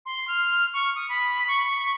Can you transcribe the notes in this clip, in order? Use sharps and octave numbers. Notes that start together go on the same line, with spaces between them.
C6
F6
C#6
D#6
B5
C#6